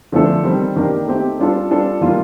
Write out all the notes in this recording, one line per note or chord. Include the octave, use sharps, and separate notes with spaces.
D3 F3 A3 D4 A4
D#3 G3 C4
D#3 A#3 D4 G4 A#4
A3 C4 D#4 G4
G3 D4 F4 A4
G3 D4 F4 A4
D#3 G3 A#3 F4